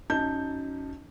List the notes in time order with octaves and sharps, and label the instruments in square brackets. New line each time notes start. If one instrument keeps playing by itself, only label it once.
[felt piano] F#2 D#4 A5 G6